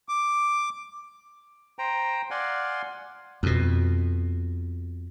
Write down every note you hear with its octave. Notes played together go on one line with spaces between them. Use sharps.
D6
C5 G5 A#5
D5 F5 F#5 G#5 C6
F2 B2